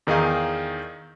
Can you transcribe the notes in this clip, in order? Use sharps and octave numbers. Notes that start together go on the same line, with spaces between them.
E2 D#3 D#4 G#4 F5